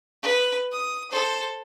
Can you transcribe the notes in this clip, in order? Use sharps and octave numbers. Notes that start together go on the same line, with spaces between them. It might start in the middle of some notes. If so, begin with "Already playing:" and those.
B4
D#6
A4 C5